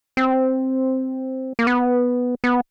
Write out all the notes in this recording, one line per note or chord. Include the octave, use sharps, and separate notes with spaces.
C4
A#3
B3
B3